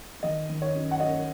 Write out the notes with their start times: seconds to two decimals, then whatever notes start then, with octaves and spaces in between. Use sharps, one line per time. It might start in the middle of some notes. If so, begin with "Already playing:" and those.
0.23 D#3 D#5
0.49 D#3
0.62 C#5
0.75 F#2
0.91 F#5
1.00 F#2 D#5